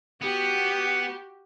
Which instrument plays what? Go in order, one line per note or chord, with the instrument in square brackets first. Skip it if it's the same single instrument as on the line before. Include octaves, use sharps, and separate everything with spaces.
[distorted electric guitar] B3 [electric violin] F#4 G4